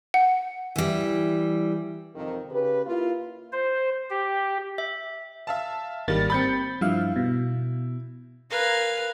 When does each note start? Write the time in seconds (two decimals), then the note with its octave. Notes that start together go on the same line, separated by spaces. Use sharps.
0.14 F#5
0.76 E3 G3
2.15 F2 C3 D#3
2.51 C#3 G4 B4
2.86 A#3 E4 F4
3.52 C5
4.10 G4
4.78 E5
5.47 E5 F5 A5
6.08 G#1 D#3 G3 A#3 A6
6.30 C4 B5 G6 A6 C#7
6.81 G2 F3 E4 F5
7.16 B2
8.50 A#4 B4 F5 G#5